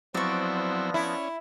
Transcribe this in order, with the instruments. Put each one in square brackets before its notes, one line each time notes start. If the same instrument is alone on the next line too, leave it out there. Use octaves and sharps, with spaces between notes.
[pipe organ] F3 B3 A#6 [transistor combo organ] F#3 C4 E4 [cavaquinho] D5 C#6
[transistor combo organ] C#4 [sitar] E4